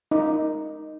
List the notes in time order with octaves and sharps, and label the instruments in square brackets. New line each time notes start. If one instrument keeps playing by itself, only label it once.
[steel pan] D#4